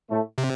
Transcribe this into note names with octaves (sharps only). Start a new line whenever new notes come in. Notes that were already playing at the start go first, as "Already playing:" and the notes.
A2 A3
C3